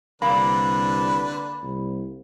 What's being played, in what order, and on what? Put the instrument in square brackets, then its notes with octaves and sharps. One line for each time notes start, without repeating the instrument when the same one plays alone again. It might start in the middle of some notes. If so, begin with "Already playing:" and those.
[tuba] C2 [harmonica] D3 D4 B4 [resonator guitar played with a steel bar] A#3 [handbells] B5
[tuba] C2